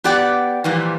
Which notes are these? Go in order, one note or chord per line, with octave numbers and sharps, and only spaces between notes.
B3 G4 D5 F#5 G5
A#2 E3 F3 G3